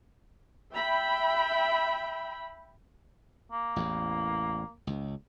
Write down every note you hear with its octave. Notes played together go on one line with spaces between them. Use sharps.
E5 G5 B5
A#3
A1 E2
C#2